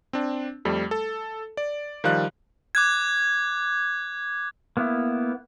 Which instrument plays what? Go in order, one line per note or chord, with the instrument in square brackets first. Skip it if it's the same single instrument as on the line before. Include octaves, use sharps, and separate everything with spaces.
[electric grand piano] C4 D4
F2 G3 A3
A4
D5
D#3 F3 G3 F5 F#6
[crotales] D6 F#6 G#6
[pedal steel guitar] A#3 B3 E4